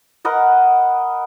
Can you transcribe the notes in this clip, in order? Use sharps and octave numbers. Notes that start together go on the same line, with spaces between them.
A#4 B4 D#5 F#5